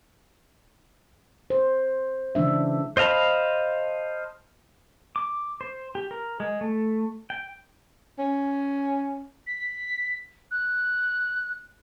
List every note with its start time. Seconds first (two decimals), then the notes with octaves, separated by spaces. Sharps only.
1.50 C5
2.35 C#3 E3 G#3 D4 E5
2.97 C5 D#5 F5 A5 B5
5.16 D6
5.61 C5
5.95 G4
6.11 A#4
6.40 G#3
6.61 A3
7.30 G5
8.19 C#4
9.47 B6
10.51 F#6